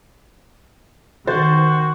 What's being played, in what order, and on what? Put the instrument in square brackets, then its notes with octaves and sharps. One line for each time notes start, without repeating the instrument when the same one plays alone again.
[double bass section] D#3 [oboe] F#4 [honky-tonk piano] C5 A6